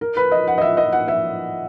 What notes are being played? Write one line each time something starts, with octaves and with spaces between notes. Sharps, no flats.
A#4
B4
D#5
F#5
D#5
E5
D#5
F#5
E5